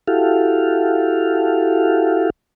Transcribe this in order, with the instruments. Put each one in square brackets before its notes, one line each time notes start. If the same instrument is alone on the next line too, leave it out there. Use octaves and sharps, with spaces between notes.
[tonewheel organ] E4 F#4 G4 A4 F5